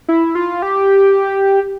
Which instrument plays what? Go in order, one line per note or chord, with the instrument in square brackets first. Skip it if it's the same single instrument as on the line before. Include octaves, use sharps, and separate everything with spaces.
[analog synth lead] E4
F4
G4